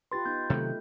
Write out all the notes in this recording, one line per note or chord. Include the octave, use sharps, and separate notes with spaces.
F4 G4 B4 C6 A6
B3 D#4 G6
C3 D#3 F#3 A3